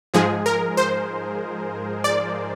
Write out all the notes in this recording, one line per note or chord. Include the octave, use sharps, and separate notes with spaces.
G#2 F3 G#3 G#4
A#4
C5
D5